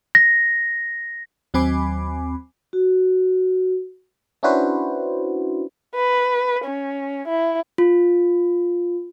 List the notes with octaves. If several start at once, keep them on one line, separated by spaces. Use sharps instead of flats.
A#6
D#2 F#3 C4 G#5 B5 D6
F#4
C#4 D4 E4 F#4 B4 C5
B4
C#4
E4
F4